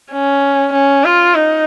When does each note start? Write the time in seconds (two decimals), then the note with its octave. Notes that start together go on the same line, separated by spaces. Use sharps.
0.12 C#4
0.73 C#4
1.04 F4
1.34 D#4